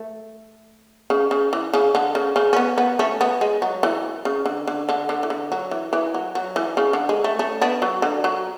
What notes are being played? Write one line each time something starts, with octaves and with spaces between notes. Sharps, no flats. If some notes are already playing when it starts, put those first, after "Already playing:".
Already playing: A3
C#3
C#3
E3
C#3
D3
C#3
C#3
C#4
B3
B3
A3 C#4
B3
G#3
F#3
E3
C#3
D3
D3
D3
D3
E3
D3
F#3
E3
E3
F#3
F#3
E3
C#3
D3
G#3
A3
A3 C#4
B3 D4
F#3
D3
F#3